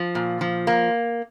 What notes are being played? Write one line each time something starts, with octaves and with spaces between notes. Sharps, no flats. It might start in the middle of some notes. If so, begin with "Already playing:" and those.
Already playing: F3
A#2
F3
A#3